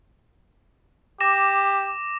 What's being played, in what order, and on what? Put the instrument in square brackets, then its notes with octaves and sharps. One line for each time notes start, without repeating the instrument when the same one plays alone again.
[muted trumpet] G4 [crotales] D6 A#6 E7